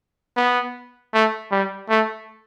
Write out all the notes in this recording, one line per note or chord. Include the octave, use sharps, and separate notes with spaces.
B3
A3
G3
A3